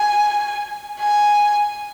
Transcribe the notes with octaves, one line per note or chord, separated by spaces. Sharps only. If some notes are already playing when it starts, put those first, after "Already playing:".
Already playing: G#5
G#5